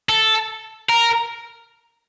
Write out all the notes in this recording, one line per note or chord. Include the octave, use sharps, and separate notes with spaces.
A4
A#4